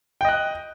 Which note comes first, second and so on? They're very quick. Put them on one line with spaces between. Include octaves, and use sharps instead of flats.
G5 D#5 F#6